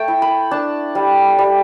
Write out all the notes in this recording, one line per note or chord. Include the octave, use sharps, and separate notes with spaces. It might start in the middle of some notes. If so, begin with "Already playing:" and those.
Already playing: A3 A4 G5 A5
E4
B5
D4 A5
G3
G3